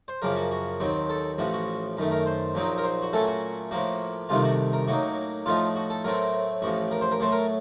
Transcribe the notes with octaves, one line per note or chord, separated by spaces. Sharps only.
C5
F#2 C#3 F3 A#3 A#4
F#4
F#4
D#2 D#3 F#3 C4
A4
A1 A2 F3 F#4
F#4
F#2 D#3 A3
A#4
C5
A#1 A#2 F#3 C4 D#4
A#4
C5
F#4
A#2 F#3 A3 C#4 A4
F#4
A2 F3 A#3 F#4
C2 C3 D#3 A3 F4
F#4
A#4
A2 F#3 A#3 D#4 F#4
A2 F3 A3 D#4 F4
F#4
A4
A2 F#3 A3 C4 A#4
A1 A2 F3 F#4
A#4
C5
A#4
A2 F#3 A3 C5
A#4